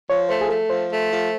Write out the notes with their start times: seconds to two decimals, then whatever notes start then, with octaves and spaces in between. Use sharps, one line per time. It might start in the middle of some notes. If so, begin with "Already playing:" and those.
0.10 F3 C#5
0.29 A3 C5
0.41 G#4
0.49 A3 A4
0.70 F3 C5
0.90 A3
1.11 F3